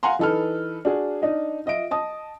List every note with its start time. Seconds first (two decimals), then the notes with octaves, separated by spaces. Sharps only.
0.03 F5 F#5 G#5 A#5 C6
0.19 E3 D#4 A4 B4 F6
0.85 D4 F#4 G#4
1.22 D4 D#4 D#5
1.66 F4 D#5 E5 D7
1.91 D#5 A5 D#6